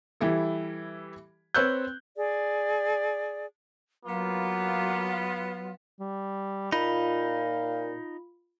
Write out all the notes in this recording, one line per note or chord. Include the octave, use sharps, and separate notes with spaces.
E3 G3 E4 A4
C4 B4 C#5 E6 F#6 G6
G#4 D5
F#3 A#3 B3 F4
G3
A#2 D#4 F4 F5 B5